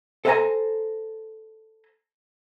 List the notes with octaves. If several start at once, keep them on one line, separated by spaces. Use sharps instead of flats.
A4 C5 E5 F#5 G#5 A#5